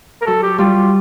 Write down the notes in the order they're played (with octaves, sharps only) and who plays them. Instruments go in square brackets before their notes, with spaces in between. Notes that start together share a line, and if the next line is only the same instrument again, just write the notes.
[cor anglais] A#4
[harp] F#3 [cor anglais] A4
[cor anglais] G4
[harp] G3 [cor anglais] F4